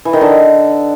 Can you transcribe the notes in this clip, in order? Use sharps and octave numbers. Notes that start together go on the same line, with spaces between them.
E3
D#3
D3